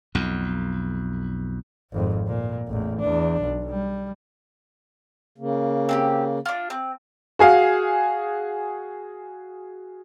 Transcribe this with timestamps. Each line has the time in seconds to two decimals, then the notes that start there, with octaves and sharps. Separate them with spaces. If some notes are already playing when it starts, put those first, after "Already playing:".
0.15 B1 F2
1.92 G#1 F2
2.27 A#2
2.67 A1 E2
3.00 E2 D4
3.41 B1
3.70 G3
5.38 C#3 A#3
5.89 C4 D4 G4
6.46 D4 F4
6.70 C4
7.39 F#4 G#4 F5